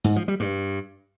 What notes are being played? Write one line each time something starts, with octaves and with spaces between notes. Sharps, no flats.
G#2
F3
G3
G2